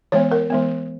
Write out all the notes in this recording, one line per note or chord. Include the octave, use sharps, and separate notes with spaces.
E3 G#3 B3 C#5
A#4
E3 G#3 B3